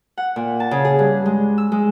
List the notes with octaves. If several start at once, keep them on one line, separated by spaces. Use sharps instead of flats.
F#5
A#2
A5
C#3
G#4
G2
G#3
E6
G#3